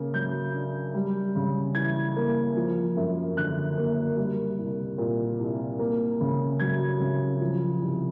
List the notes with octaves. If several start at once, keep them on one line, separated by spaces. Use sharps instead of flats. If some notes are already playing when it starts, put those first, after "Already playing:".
Already playing: C#3 A#3
F#3 G6
D4
G3
C#3
E3 G#6
A#3
F3
F#2
D3 F#6
A#3
G3
C2
A#2
C2
A#3
C#3
F#3 G#6
C#3
F3
C2